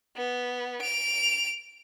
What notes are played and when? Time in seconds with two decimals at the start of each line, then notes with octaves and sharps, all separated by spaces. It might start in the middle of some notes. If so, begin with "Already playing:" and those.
0.17 B3
0.82 D7 F7